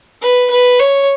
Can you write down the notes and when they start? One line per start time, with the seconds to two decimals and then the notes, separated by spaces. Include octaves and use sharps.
0.22 B4
0.50 B4
0.79 C#5